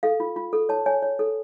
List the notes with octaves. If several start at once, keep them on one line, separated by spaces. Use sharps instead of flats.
A4 F5
F4
F4
A4
C#5 A5
C#5 G#5
C#5
A4